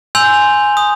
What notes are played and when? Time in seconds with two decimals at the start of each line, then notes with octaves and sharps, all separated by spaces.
0.15 G#5 C6 E6 G6 F7
0.77 D#6